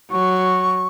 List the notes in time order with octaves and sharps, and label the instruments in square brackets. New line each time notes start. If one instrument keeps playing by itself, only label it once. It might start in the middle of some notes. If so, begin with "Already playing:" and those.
[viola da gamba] F#3 [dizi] C#6